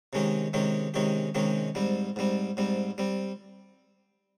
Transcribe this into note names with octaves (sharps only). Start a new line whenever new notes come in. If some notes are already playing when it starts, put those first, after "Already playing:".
C3 D#3 G#3 C#4 G4
C3 D#3 G#3 C#4 G4
C3 D#3 G#3 C#4 G4
C3 D#3 G#3 C#4 G4
G#2 G3 C4
G#2 G3 C4
G#2 G3 C4
G3 C4